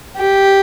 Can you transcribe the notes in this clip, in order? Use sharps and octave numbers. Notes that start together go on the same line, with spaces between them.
G4